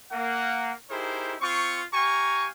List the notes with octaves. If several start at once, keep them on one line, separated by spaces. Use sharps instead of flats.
A#3 F#5
D#4 E4 G4 G#4 A#4 C5
C4 F4 C5 C#6
G4 F5 G#5 A#5 C#6